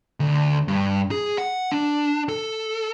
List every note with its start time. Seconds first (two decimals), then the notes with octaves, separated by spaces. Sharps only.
0.20 D2
0.68 G2
1.11 G#4
1.38 F#5
1.72 D4
2.29 A4